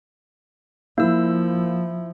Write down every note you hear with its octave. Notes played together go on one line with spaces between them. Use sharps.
F3 A#3 E4 E6